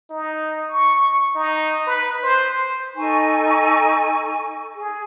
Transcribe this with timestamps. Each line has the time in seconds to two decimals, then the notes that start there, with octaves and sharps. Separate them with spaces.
0.10 D#4
0.69 C#6
1.35 D#4
1.87 B4
2.23 C5
2.96 D#4 A4 G#5 C#6
4.74 G#4